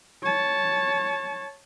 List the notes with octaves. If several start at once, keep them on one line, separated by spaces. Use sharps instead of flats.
C#5 A5